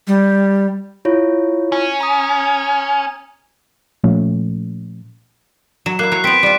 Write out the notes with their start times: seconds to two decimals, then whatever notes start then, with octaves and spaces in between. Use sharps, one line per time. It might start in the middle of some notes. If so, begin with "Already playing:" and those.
0.07 G3
1.05 E4 F4 C#5
1.72 C#4
2.00 A#5 D#6
4.04 A#2 F3 A3 C#4
5.86 F#3 E7
5.99 A#3 E4 F#6 C7
6.12 F#3 C#5 F#6
6.24 B3 C4 B6 D7
6.43 G3 F4